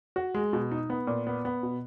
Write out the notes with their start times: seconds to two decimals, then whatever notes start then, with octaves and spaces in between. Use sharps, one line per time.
0.16 F#4
0.35 G#3
0.53 B2
0.72 D#4
0.90 B3
1.07 A#2
1.27 B3
1.45 B3
1.63 B2